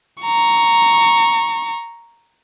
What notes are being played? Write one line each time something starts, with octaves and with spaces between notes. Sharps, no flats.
A#5 C#6